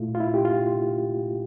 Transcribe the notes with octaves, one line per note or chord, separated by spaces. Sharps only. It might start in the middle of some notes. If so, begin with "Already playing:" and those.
Already playing: A#2 A3 E4 F4
F4
E4
G4
F4